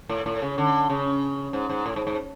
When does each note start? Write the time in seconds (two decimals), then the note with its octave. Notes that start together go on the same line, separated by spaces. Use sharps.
0.09 A2
0.26 A2
0.42 C#3
0.58 D3
0.90 C#3
1.53 G#2
1.70 G#2
1.86 A2
1.96 G#2
2.07 G#2